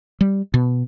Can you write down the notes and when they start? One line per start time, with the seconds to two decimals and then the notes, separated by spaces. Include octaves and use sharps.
0.21 G3
0.54 B2